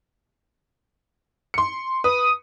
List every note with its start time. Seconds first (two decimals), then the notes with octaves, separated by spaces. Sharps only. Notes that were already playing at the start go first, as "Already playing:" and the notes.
1.54 C6 C#7
2.04 B4 D#6